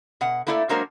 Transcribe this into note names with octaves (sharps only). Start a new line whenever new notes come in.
B2 F#5
A3 A#3 E4 A4 C5 D5
F#3 G#3 A#3 D4 A#4 C5